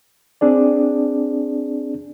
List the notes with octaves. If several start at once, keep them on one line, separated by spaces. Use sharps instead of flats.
C4 D4 G#4 D5